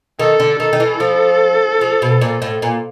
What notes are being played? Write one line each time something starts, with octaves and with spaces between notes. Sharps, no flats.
D#3 A4
D3
D#3 A4
D#3
E3
F3
F3
B2
A#2
A2
A#2